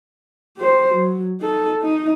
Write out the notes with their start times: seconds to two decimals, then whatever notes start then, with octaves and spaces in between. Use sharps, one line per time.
0.57 G4 C5
0.94 F#3
1.40 D#4 A4
1.80 D#4